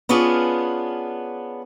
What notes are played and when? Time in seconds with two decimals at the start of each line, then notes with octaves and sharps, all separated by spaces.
0.09 B3 C#4 D4 F4 G#4